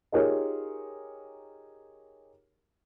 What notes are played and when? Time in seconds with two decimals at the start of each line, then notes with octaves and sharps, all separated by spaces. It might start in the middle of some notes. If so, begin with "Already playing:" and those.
0.12 D#4 F4 G4 G#4 A#4 C#5